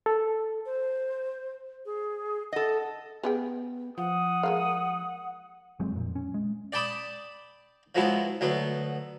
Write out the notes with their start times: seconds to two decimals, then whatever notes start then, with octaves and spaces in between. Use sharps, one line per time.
0.06 A4
0.65 C5
1.85 G#4
2.52 A4 D#5 F#5
3.23 B3 G4 G#4 G5
3.98 F3 F#5 D#6
4.43 G#3 A#3 F5
5.80 G1 F#3 G#3 C4
5.92 F2 A#2
6.16 C#4
6.34 G#3
6.73 D5 G5 A5 B5 D6 D#6
7.95 F3 F#3 G#3 B3 E4
8.41 D2 F#3 B3